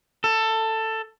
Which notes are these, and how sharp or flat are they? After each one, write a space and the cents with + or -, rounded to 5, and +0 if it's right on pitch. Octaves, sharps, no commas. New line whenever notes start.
A4 +15